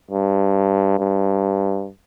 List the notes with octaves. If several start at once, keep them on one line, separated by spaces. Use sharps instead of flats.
G2
G2